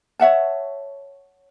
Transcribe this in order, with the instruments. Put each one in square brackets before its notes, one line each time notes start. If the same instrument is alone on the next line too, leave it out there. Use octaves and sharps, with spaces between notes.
[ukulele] C#5 E5 F#5 A5